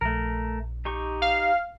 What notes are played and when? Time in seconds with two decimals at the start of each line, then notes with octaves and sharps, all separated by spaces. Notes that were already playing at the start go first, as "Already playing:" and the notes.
0.01 A#1 A3 A#4
0.85 D#4 G4 C#6
1.22 F5